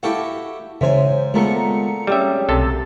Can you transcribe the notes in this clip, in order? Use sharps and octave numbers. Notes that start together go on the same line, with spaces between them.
E4 F#4 G4 A4 F5
G#2 C#3 E3 C5 C#5 E5 G#5
A#2 D#3 G#3 A3 B3 F4 A#5 C#7
G3 C4 C#4 G#4 E5
B1 C3 A4 A6